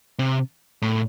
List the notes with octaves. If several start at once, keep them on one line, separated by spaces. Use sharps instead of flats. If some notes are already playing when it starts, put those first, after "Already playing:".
C3
A2